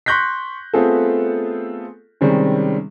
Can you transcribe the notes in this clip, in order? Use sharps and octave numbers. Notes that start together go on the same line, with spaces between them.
C6 C#6 F#6 G6 A#6 B6
A3 B3 C4 F4 G#4 A4
C3 D#3 G3 G#3 C4 C#4